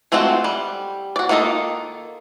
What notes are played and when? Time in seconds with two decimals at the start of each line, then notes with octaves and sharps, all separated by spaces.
0.12 G#3 A3 C4 F4 F#4
0.44 G3
1.16 F#4 D5
1.29 D#3 A#3 F4 A4 D#5